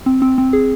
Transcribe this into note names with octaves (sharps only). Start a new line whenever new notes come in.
C4
C4
C4
G#4